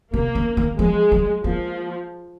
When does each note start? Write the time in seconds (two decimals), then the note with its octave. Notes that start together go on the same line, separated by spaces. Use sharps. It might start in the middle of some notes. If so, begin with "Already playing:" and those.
0.14 C3 A#3
0.35 C#3
0.57 D#3
0.79 F3 G#3
1.12 F#3
1.44 F3 A#3